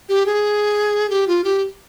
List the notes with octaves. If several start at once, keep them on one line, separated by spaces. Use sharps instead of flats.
G4
G#4
G4
F4
G4